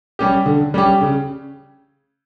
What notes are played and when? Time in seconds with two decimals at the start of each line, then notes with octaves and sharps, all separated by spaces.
0.19 G3 C#4 G4
0.46 D3
0.74 G3 C#4 G4
1.01 C#3